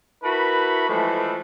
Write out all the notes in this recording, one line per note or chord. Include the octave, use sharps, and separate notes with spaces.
D4 E4 F#4 A#4 B4 B5
E3 F3 G#3 A3